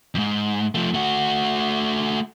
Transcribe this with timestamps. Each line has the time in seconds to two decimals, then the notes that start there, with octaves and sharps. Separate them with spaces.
0.15 F2 G#2
0.75 F3 A3
0.94 A3 F#4